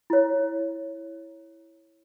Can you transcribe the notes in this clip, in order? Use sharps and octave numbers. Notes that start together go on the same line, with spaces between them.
E4 C#5